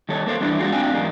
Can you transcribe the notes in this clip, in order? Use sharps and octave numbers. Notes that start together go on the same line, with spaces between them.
D#3 G3 A4 C#5
A#3 A4 C5 F5
E2 E3 G3 D4 E4
G3 G#3 F4 F#4 G#4
A2 C4 D4 F5 G5 G#5
E2 G#2 G3 A#3